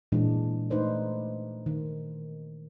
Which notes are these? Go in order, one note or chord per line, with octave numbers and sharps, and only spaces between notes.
A#2 E3 G#3 D4
A3 D#4 B4 C5 D5
D#3